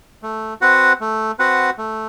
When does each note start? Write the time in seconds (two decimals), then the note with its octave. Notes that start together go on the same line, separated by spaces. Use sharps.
0.23 A3
0.61 C4 F#4 B4 F#5
1.01 A3
1.39 C4 F#4 B4 F#5
1.78 A3